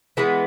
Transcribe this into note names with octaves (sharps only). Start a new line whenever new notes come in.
E3 G#3 B3